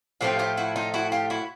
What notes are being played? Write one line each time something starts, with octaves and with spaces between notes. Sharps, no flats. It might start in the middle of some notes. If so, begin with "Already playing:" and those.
A2 F3 A3 C4 F4 G4
F4 G4
E4 F#4
D#4 F4
E4 F#4
F4 G4
E4 F#4